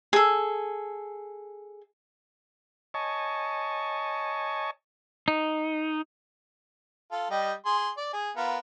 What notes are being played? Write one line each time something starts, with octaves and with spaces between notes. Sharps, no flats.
G#4 A4
C#5 D#5 G#5 A5 C#6
D#4
F4 A4
G3 G4 D#5
G#4 C6
D5
G#4
B3 F4 A#4